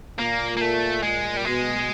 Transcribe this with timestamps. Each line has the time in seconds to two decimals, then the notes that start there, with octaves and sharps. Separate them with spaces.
0.19 A#2 A#3
0.57 A#3
0.61 A3
1.03 A#2 G#3
1.37 G3
1.45 B2 G#3